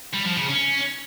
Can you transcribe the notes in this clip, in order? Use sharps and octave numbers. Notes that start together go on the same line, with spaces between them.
G3
F3
C#3
C#4